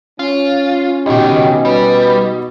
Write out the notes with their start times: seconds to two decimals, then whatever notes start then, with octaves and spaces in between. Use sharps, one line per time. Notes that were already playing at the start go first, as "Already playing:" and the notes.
0.19 C#4 F4
1.06 C#2 B2 D#3 D#4 G4
1.65 G3 B4